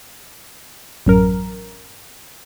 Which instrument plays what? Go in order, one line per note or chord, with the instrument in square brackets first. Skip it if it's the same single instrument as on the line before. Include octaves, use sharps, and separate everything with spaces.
[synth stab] A1 F#2 A#4